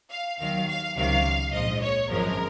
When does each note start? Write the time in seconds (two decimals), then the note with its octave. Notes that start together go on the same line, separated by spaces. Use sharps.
0.09 F5
0.38 D#2 D#3 F#3 F5
0.67 F5
0.95 C#2 C3 D#3 F#3 F5
1.52 A#1 G#2 F3 D#5
1.81 C#5
2.09 G#1 F#2 F3 G#3 A#4